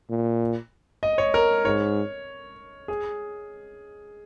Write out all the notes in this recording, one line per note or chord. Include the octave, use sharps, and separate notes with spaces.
A#2
D#5
C#5
A#4
G#2 C#5
G#4